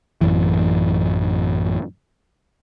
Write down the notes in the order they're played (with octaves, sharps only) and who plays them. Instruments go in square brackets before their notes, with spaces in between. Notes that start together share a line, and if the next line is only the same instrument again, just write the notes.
[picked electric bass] A1 F#2 E3